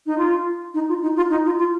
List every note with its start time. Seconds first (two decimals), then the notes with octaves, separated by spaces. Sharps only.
0.06 D#4
0.18 F4
0.74 D#4
0.89 F4
1.02 D#4
1.16 F4
1.30 D#4
1.45 F4
1.58 F4